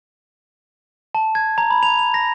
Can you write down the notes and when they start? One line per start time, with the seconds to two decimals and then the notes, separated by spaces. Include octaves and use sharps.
1.15 A5
1.35 G#6
1.58 A#5
1.70 B5
1.83 F7
1.99 F7
2.14 A#6